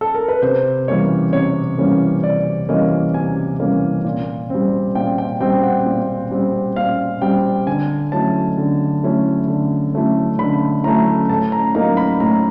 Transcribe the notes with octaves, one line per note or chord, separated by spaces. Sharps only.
A4
A#4
B4
C3 C5
E3 G3 A#3 C#4 C#5
C3 C#5
E3 G3 A#3 C#4
C3 D5
E3 G3 A#3 C#4 D#5
C3 G#5
E3 G3 A#3 C#4
A#2
G3 C4
A#2 G5
G5
G3 C4 G5
F#5
A#2
G3 C4
A#2 F5
G3 C4 G5
D3 G#5
F#3 A3 C#4 E4 A5
D3
F#3 A3 C#4 E4
D3
F#3 A3 C#4 E4
D3 B5
F#3 A3 C#4 E4 A#5
A2 A5
A#5
F#3 A#3 D#4 A#5
B5
A2 A#5